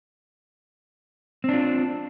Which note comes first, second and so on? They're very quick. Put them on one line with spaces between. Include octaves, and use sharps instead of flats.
C4 D4 F4